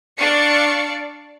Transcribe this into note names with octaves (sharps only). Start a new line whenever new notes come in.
D4 D5 F5 C#6 C#7